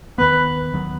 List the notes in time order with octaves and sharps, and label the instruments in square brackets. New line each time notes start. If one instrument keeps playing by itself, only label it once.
[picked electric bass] D#2 D#3 F#3 B3 [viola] B4
[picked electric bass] D#2 D#3 F#3 B3